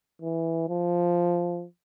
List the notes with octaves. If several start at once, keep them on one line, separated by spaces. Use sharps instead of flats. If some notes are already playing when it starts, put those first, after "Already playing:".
E3
F3